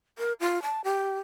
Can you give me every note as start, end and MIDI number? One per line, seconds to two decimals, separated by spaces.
0.18 0.33 70
0.40 0.62 65
0.63 0.81 81
0.84 1.19 67